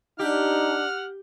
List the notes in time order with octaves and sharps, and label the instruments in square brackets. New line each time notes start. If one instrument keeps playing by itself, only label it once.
[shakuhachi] D4 [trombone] D#4 [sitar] G4 [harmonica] F#5 F6